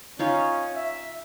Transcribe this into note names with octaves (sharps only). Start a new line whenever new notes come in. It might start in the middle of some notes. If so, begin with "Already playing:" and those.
C#4 D#4 F4 C#5
E5